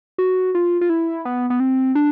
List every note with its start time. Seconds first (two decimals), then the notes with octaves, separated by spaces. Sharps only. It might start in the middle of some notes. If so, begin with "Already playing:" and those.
0.18 F#4
0.55 F4
0.81 F4
0.89 E4
1.25 B3
1.50 B3
1.60 C4
1.95 D4